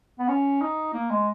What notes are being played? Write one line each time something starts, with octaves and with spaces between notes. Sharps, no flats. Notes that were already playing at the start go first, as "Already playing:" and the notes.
B3
C#4
D#4
A#3
G#3